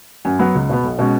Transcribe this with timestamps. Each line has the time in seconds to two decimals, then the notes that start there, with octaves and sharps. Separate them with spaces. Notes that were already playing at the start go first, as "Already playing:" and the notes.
0.25 F#2 G#5
0.39 F#3 B3 F#5
0.55 C#2
0.69 B2 B3
0.84 B1
0.98 B2 G#3 C#4